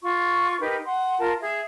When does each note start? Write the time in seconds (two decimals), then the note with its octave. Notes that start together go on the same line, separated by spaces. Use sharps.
0.02 F4 C#6
0.59 D#4 G4 A#4 B4
0.85 F#5 C6
1.18 F4 A#4 A5
1.41 G#4 E5